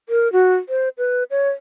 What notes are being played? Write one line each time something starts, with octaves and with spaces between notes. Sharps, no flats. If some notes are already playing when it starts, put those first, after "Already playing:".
A#4
F#4
C5
B4
C#5